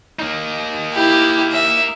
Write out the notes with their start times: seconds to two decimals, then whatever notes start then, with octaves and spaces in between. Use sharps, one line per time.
0.19 A#3 D#4
0.94 E4 G4
1.52 E5